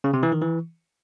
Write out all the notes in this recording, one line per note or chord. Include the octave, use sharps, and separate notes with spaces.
C#3
C3
E3
D#3
E3